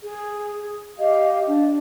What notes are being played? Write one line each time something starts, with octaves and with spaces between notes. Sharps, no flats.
G#4
G4 D#5 F5
D4